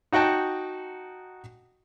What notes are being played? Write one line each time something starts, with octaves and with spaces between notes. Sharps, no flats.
D#4 F#4 F#5 G5 A5